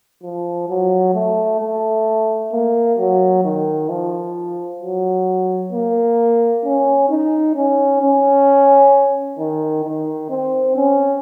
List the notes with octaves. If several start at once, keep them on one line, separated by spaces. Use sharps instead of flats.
F3
F#3
A3
A3
A#3
F#3
D#3
F3
F#3
A#3
C#4
D#4
C#4
C#4
D#3
D#3
C4
C#4